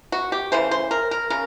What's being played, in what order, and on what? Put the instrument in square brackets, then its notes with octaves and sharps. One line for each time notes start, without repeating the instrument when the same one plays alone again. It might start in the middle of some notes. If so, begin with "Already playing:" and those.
[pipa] F#4
G4
C#3 E3 A3 C5
C5
A#4
A#4
C#3 A#4